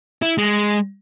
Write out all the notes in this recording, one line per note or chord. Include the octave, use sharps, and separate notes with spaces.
E4
G#3